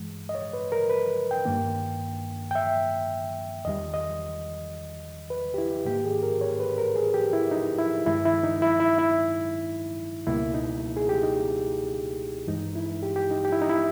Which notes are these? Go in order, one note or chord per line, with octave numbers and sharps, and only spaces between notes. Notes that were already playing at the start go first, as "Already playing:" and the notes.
Already playing: G2 E3 G#3
D#5
C#5
B4
A#4
B4
G5
G2 D#3 A#3
G5
E5
E2 D#3 G3 D#5
D#5
B4
G4
E4
G#2 D#3 A#3 G4
G#4
A#4
C#5
B4
A#4
G#4
G4
E4
D#4
E4
G2 D#3 G#3 E4
E4
D#4
E4
E4
E4
C#2 B2 G3 A#3 E4
D#4
G#4
G4
D#4
G2 E3 G#3 D#4
E4
G4
G4
D#4
G4
E4
D#4
E4